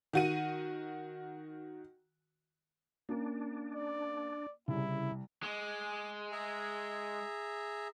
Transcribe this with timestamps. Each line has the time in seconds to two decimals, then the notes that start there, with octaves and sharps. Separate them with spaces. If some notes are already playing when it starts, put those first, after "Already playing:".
0.13 D#3 F#4 D#7
3.09 A#3 C#4 D4
3.75 D5
4.68 C2 C#3 E4
5.43 G#3 D6
6.32 G#4 E5 A#5